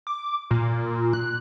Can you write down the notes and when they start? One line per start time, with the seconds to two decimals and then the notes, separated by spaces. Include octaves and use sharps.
0.07 D6
0.51 A#2
1.13 F#6